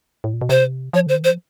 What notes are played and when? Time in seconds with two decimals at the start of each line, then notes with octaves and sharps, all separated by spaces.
0.24 A2
0.34 A#2
0.41 B2
0.49 C3 C5
0.93 F3 C#5
1.07 D3 C5
1.15 D#3
1.22 E3 C5
1.30 F3